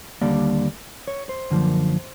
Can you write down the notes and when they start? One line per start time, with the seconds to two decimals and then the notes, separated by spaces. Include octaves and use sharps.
0.21 D#2 D3 G3 A#3 D5
1.08 C#5
1.29 C5
1.51 F#2 D3 F3 A#3